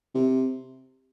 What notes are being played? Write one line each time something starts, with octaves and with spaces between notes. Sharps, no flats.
C3